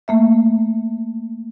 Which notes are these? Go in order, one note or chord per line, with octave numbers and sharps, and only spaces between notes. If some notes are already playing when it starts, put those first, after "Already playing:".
A3 A#3 E5